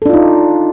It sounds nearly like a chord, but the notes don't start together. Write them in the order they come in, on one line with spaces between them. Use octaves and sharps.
A4 D4 F4 D#4